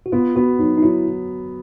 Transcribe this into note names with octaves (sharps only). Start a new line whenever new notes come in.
F#4
B3 F4
B3 F#4
F#3 D#4
D#4
F#3 E4